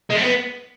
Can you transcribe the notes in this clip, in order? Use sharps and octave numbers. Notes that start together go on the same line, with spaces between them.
G#3
A3
B3